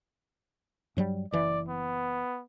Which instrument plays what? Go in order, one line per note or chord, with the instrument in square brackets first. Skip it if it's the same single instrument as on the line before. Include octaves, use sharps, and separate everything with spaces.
[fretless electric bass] G2 F#3 G3
[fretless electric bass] F#1 E3 [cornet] D5
[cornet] B3